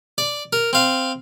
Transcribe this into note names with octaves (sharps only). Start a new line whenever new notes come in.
D5
A#4
C4 F5